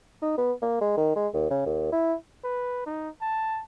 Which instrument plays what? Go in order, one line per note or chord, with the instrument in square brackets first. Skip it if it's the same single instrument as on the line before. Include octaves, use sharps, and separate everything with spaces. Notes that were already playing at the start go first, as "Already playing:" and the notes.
[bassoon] D#4
B3
A#3
G#3
D#3
G#3
D#2
C#3
D#2
E4
[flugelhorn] B4
D#4
A5